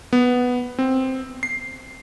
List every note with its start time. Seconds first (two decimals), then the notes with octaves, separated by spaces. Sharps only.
0.13 B3
0.79 C4
1.43 C7